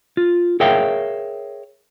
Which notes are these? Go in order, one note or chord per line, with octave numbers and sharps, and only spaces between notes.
F4
G#4 A#4 C#5 E5 F5 G5